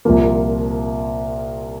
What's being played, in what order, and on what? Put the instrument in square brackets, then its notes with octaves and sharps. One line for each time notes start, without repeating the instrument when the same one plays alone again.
[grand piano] C2 A#2 F3 A#3